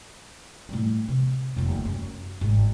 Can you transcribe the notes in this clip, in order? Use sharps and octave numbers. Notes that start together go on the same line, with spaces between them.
A2 G3
C3
F1 D#2
F#2
G#1